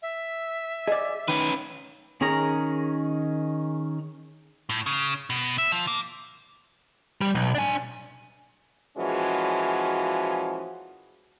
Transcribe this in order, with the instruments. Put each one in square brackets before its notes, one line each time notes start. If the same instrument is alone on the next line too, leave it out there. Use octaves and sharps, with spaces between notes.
[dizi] E5
[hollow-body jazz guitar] G#4 D5 [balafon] D#5
[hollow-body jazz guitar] D#3 [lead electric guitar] C#4 B4
[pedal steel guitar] D#3 C#4 G#4 A#4 A#5
[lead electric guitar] A2
C#3
B2
E5
F3
A#3
[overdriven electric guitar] G3
B1
D4 G#5
[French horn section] A#2 E3 F3 G#3 C#4 F#4